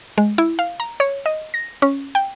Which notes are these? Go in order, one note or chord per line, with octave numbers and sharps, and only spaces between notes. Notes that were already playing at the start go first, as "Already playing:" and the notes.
G#3
E4
F5
A#5
C#5
D#5
A#6
C#4
G5